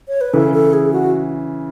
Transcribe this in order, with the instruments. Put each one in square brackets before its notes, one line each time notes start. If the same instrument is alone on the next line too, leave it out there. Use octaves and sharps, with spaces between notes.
[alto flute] C#5
B4
[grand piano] C#3 E3 [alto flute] A4
[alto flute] A4
G#4
F#4